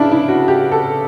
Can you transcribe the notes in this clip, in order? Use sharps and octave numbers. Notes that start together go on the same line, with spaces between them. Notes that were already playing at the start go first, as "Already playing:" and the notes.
Already playing: C#3 D4 E4
E4
F#4
G4
A4